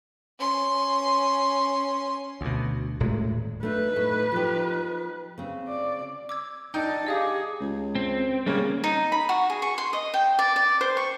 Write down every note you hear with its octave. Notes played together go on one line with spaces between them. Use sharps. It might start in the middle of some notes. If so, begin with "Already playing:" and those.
C#4 C6
D2 B2
D#1 A2 G#3
A3 D4 D#4 B4
A2
F3 G4
C#3 C4
D5
D6 E6 G#6
D4 D#4 G5 A5 E6 G6
G4 G#4 D#5 F5 D#6
C#2
C4
C#3 G3 A#3 C#4
D#4
B5
F#4
G#4
C#6
C6
D#5
G5
D5
D5
C5
C#6